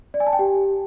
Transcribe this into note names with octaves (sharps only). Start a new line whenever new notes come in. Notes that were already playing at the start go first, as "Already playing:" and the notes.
D5
G#5
A5
G5
G4